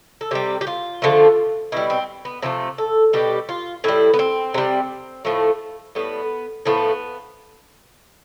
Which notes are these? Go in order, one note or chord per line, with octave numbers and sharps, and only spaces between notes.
A4
C3 G3 G4
G4
F4
D3 F3 A3
B2 G3 E4
C4
B3
C3 F3 A3 C4
A4
B2 G3 G4
F4
A2 G3 E4
B3
C4
C3 G3
A2 F3 A3
A2 G3 B3
A2 F3 A3 B3